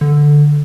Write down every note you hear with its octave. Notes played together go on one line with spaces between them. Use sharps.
D3